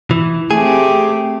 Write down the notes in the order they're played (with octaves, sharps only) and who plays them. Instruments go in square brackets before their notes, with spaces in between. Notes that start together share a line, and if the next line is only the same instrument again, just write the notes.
[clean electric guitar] E3
[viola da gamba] A3 C4 G4 [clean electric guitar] G#4